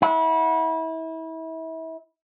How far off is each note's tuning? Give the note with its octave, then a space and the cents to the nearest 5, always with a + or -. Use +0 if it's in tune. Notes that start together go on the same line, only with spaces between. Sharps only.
E4 -30 F#5 -25